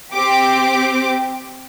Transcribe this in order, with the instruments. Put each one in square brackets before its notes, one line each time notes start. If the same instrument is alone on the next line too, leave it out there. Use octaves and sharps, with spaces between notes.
[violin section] C4 G4 D6